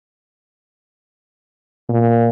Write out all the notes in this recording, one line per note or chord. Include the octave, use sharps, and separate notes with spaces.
A#2